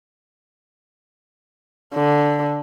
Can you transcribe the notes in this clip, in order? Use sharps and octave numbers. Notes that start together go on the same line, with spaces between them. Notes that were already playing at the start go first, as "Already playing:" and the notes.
D3